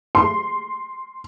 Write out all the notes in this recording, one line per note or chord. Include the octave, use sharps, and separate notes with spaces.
C6